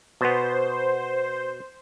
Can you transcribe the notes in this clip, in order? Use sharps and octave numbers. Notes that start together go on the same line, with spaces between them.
B2 B3 C5